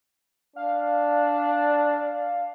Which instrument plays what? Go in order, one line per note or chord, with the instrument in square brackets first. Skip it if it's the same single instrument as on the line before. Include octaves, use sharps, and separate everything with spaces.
[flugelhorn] D4 [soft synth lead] F5